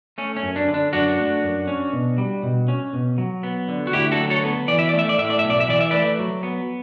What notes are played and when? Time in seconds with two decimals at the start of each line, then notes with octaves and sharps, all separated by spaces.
0.18 A3 C#4
0.36 C#4
0.43 F#2
0.56 D4
0.68 D3
0.74 D4
0.93 F#2 D4 F#4
1.18 A3
1.43 F#2
1.67 C#4
1.93 B2
2.18 G3
2.43 B2
2.68 C#4
2.93 B2
3.18 F#3
3.43 B3
3.68 D3
3.87 F#4
3.92 D2 E4 G4
4.11 F#4 A4
4.18 F#3
4.30 A4 C#5
4.44 B3
4.68 E3 D5
4.79 E5
4.89 A3 D5
4.99 E5
5.09 D5
5.18 A2 E5
5.30 D5
5.39 B1 E5
5.50 D5
5.60 E5
5.68 E3 D5
5.81 E5
5.91 A3 B4 D5
6.19 F#3
6.43 B3